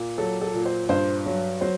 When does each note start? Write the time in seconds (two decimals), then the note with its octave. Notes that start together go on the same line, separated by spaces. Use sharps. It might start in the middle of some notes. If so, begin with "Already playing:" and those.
Already playing: A#2
0.18 F#3 A4
0.41 A4
0.54 A#2
0.66 C5
0.89 G2 C5
1.26 F#3
1.61 F#3 C5